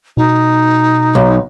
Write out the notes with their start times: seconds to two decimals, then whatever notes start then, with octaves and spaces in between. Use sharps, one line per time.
0.17 B2 D#4
1.15 B1